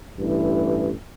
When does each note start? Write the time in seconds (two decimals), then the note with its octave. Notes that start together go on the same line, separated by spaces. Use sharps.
0.16 A1 G2 E3